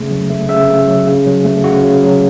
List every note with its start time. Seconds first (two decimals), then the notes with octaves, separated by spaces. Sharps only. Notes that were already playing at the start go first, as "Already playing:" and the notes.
Already playing: C#3 A3
0.10 F#3
0.30 A3
0.49 C#3 E5
0.68 C#3
0.87 F#3
1.07 C#3
1.26 F#3
1.45 A3
1.64 C#3 F#4
1.84 C#3
2.02 F#3